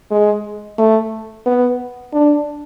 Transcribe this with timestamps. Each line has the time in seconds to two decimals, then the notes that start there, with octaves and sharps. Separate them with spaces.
0.11 G#3
0.78 A3
1.46 B3
2.13 D4